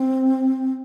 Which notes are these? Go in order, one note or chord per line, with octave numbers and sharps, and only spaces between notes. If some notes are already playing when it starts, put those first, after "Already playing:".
Already playing: C4